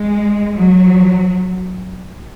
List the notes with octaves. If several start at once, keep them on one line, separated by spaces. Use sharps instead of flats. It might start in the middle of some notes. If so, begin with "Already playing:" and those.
Already playing: G#3
F#3